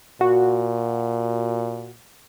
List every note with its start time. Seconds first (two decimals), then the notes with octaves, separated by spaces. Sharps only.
0.21 A#2 F#4